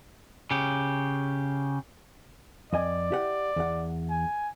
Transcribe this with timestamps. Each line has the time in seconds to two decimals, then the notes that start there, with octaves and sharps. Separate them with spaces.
0.51 C#3 G4
2.73 F2 D5 D#5 G#5
3.10 E4 G4 F#5
3.56 E2 F#5
4.10 G#5